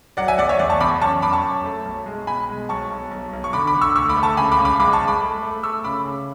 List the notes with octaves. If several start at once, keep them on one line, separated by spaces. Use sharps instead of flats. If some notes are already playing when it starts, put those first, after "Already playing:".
F#3 D5 F#5
E5 G#5
E2 D5 F#5
C#5 E5
E2 D5
A5 C#6
E2 B5 D6
F#2 A5 C#6
F#2 B5 D6
A5 C#6
F#2
A3
B1
G#3
B2 G#5 B5
G#3
B1 A5 C#6
B1
B1
B1
C#6
D3 B5 D6
B5 D6
D3
C#6 E6
D2 C#6 E6
B5 D6
A3
A5 C#6
C#2 G#5 B5
B5 D6
C#2
B5 D6
G#3 B5 D6
A5 C#6
G#3
B5 D6
A3
A3
A3 C#6 E6
C#3 B5 D6
C#3